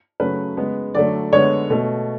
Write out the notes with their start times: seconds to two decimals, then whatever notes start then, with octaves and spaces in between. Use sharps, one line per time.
0.20 C#3 F#3 A3 B4
0.57 C#3 G#3 B3
0.94 D3 F#3 A3 D5
1.33 D3 G#3 B3 C#5
1.70 B2 A3